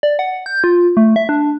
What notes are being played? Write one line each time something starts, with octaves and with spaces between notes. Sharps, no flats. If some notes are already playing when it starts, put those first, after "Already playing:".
D5
F#5
G6
F4
A3
E5
D4